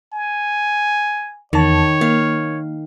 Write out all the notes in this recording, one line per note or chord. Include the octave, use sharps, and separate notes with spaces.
G#5
E2 D#3 C#5 A5
A#3 F5